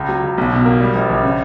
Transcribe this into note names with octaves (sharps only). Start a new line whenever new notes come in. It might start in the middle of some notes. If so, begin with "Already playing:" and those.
Already playing: C#2
F#3
C#2
B1
B2
A#3
G3
A#1
A#1
C#3